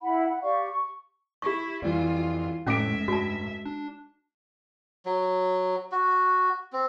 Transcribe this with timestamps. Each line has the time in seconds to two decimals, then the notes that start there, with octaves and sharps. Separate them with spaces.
0.01 E4 F#5 B5
0.28 F#5
0.42 G4 D5 F5 C#6
0.71 C#6
1.42 E4 G4 C#6
1.82 F2 E3 G3 F4
2.67 F1 A2 G#3 C#4 E5 F#5 D6 D7
3.08 G2 F#4 A5
3.65 D4
5.06 F#3
5.92 F#4
6.73 C4